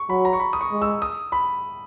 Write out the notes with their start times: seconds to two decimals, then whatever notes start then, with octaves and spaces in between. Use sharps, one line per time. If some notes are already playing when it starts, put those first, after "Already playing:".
Already playing: C#6
0.09 F#3 B5
0.25 A#5
0.33 C#6
0.40 B5
0.53 D#6
0.61 C#6
0.71 G#3
0.82 E6
1.02 D#6
1.32 B5